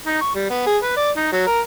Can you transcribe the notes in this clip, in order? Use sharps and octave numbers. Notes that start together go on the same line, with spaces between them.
D#4
C#6
G3
B3
G#4
B4
D5
D#4
F#3
A#4